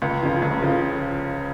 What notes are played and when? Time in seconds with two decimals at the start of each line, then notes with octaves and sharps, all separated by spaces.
0.02 C#2
0.22 C#3 F3
0.42 C#2
0.62 C#3 F3